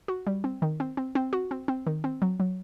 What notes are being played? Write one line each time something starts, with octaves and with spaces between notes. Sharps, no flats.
F#4
G3
C4
D#3
C4
C4
C4
F#4
C4
C4
D#3
C4
F#3
F#3